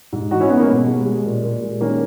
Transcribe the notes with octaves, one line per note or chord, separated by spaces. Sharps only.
G#2
E3 D#4 F#4
C#4 E4
G#3 B3 D#4
A#3 C#4
B2
G#3
G#3
A#2
A#2
G#3
D#3 A#3 C#4